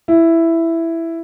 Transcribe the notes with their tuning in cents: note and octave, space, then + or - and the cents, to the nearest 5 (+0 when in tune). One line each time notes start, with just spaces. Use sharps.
E4 +5